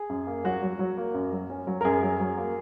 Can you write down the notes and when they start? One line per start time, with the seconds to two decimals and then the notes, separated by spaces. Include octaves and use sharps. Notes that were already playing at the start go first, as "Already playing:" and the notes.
Already playing: G#4
0.09 F#2
0.27 A#3
0.44 F#3 F#4
0.63 F#3
0.79 F#3
0.97 A#3
1.14 F#2
1.32 F#3
1.50 C#4
1.67 F#3
1.81 A#4
1.85 F#2 G#4
2.03 F#3
2.20 F#3
2.38 A#3